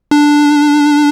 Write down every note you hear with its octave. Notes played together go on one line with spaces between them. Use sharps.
D4